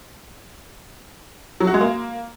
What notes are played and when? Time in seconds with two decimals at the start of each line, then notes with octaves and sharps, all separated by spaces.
1.60 F#3
1.67 F#4
1.74 G#3
1.81 A#3